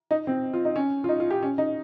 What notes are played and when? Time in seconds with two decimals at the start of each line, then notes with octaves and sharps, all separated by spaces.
0.11 D#4
0.27 C4
0.53 F4
0.65 D#4
0.76 C#4
1.04 F4
1.09 D#4
1.20 F4
1.30 G4
1.42 C#4
1.58 D#4